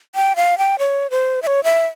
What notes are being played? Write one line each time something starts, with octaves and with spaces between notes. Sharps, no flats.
G5
F5
G5
C#5
C5
E5
C#5
E5